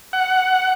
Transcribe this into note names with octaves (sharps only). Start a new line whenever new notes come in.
F#5